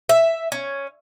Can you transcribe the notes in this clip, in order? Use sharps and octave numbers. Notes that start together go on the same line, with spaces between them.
E5
C#4